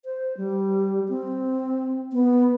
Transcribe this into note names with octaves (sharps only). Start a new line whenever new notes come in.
C5
G3
C4
B3